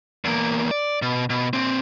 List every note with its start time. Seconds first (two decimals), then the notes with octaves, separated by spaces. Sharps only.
0.25 E2 A#3
0.71 D5
1.02 B2
1.30 B2
1.53 A#2 C4